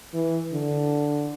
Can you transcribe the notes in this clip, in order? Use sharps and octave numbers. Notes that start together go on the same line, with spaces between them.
E3
D3